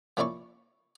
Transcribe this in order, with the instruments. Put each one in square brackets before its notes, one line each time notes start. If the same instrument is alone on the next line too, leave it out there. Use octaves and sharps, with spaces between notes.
[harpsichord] F3 A#3 C#4 E4 D5 C#6